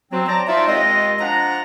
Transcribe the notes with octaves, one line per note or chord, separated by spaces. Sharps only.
F#3 C4
C5 D5 A5 A#5
F3 D#4 F4 C#5 D5 E5
D#2 G#3 C4 F4 D#5
F3 D4 F#5 A#5